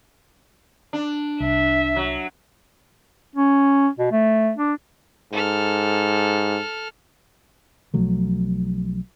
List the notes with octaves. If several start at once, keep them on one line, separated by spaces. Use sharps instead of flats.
D4
C2 E5
F#3
C#4
B2
A3
D4
G#2 A4 F6
B1 F3 F#3 A3